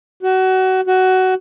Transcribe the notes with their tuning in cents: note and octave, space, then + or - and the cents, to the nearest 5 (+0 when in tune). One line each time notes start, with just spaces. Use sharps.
F#4 +25
F#4 +15